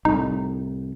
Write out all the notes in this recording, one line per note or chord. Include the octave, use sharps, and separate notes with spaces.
C2 A2 D#4